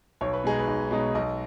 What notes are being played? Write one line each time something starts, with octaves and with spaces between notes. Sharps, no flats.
B1 C#5
B4
B2 G#3 D#4 G#4
B4
B1
B2 G#3 D#4
B1 D#5